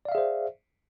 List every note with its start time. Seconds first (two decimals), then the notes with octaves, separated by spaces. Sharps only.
0.05 D5
0.09 F5
0.12 E5
0.15 G#4
0.18 C5